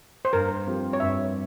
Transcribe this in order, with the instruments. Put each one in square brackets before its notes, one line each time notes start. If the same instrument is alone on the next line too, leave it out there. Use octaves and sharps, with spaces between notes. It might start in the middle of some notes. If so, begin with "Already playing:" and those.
[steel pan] C5
[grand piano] G2 [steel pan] A#4
[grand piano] F3 C4 G4
[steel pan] C#5
[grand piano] G2 [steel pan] E5